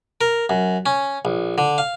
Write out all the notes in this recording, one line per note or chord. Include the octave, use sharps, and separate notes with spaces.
A#4
F#2
C#4
A#1
D3
F5